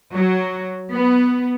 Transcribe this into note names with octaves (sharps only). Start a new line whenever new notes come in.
F#3
B3